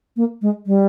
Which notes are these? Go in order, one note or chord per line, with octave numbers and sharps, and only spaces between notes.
A#3
G#3
G3